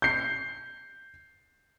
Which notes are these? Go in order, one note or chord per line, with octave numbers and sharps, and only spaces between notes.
G6 C7